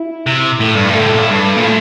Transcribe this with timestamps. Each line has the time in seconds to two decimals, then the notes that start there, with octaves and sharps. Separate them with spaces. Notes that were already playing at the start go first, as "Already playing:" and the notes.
Already playing: E4
0.27 C3
0.60 A2 A4
0.75 G2
0.88 A2
0.95 D3 A4
1.06 C3
1.15 A#2
1.22 A2
1.30 G2 A4
1.57 A#2
1.64 A2